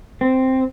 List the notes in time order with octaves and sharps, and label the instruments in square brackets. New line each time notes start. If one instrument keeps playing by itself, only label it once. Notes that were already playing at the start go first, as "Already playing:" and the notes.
[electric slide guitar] C4